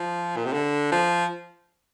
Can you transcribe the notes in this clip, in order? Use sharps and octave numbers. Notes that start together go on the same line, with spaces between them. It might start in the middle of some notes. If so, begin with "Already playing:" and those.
Already playing: F3
A#2
C3
D3
F3